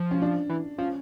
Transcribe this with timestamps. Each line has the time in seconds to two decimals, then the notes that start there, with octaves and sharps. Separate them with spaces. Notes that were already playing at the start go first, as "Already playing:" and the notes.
Already playing: F3
0.11 C#4
0.22 D4
0.50 E3
0.78 F3 C#4